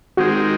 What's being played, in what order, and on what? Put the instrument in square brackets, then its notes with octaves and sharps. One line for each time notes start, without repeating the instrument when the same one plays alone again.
[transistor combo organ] D#3 G#3 C4 [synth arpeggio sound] F#4